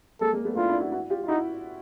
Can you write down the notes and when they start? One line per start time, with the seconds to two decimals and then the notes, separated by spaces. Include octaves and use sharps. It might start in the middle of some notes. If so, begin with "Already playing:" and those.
0.21 G#3 A#3 A4
0.32 G#3 A#3
0.45 A3 B3
0.56 D4 E4 F4
0.69 D4 E4
0.80 E4 F#4
0.92 E4 F#4
1.10 F4 G4
1.24 F4
1.28 D#4 E4 F#4